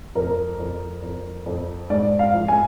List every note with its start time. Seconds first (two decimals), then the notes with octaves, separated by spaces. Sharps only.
0.15 F2 A#4
0.59 F2
1.03 F2
1.46 F2
1.90 G#2 D5
2.19 F5
2.34 F3
2.48 G#5